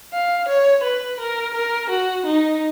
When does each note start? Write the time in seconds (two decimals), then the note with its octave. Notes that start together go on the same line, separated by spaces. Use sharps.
0.13 F5
0.48 C#5
0.84 B4
1.20 A#4
1.55 A#4
1.90 F#4
2.26 D#4